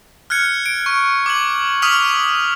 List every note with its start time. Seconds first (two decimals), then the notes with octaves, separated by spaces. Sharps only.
0.30 F6 F#6 G#6 C#7
0.66 D7
0.86 C#6
1.26 D6 G#6 F#7
1.82 C#6 D#6 F6 B6 F7 F#7